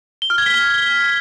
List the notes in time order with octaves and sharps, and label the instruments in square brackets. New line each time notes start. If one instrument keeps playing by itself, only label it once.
[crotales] G7
F6
G#6
B6
G7